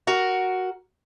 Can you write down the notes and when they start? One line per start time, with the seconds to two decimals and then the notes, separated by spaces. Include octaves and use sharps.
0.07 F#4 A#4